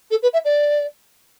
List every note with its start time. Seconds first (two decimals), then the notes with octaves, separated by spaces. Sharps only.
0.11 A4
0.23 B4
0.33 E5
0.45 D5